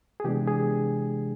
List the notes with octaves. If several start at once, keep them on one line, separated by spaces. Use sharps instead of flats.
G#4
C3 E3 G#3 B3 D4 G4
G#4